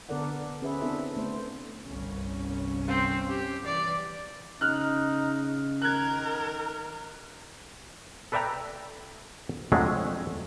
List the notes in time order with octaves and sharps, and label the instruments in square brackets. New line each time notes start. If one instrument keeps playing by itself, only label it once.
[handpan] D3 B3 A4 A#4 D5 F#5
C#4 G#4 B4 C5 E5
B3 C4 D4 E4 A4 E5
A3 B3 C5
[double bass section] G1 C2 C#4
[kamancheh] C4
G4
[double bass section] E3 [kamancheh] D5
[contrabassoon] C#3 [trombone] D#4 [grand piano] F6 F#6
[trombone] D#3 [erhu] A#4 [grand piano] F#6 G#6
[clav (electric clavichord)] A4 B4 D5 E5 G5 A#5
F2 D3 F#3 G#3 A3